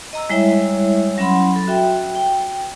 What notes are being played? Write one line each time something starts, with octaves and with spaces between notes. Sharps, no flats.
D#5 A#5 E6
G3 G#3 E4 C#5 E5
F#3 C#4 F#5 B5 C6
A4
F#4 E5 G5
G5